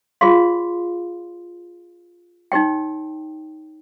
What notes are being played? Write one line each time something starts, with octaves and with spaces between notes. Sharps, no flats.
F4 G#4 C#5 F5 C6
D#4 G4 C#5 G5